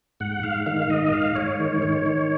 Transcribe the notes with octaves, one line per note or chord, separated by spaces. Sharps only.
G#2 F#5
G#2 F5
D#3 F5
G#2 D#5
G#2 F5
G#2 C#5
D#3 C#5
D#3
D#3